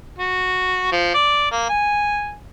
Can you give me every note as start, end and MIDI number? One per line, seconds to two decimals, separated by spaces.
0.19 0.89 66
0.92 1.11 53
1.14 1.50 74
1.51 1.66 58
1.69 2.33 80